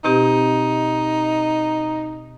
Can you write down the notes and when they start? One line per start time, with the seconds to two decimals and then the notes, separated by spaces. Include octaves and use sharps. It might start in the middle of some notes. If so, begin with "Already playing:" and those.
0.05 B2 C4 D#4 G4